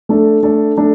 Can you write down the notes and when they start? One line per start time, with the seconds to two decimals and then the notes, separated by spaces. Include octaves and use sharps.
0.09 A3 D4 A4
0.43 A3 D4 A4
0.78 A3 D4 A4